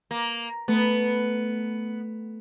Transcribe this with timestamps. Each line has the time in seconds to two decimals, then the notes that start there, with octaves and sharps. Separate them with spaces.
0.11 A#3
0.68 A3 B3 B5